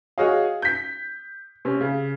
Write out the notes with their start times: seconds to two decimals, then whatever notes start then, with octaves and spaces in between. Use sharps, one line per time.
0.18 F#4 G#4 C#5 D#5 F5
0.62 G6 B6
1.65 C3 C#4
1.80 C#3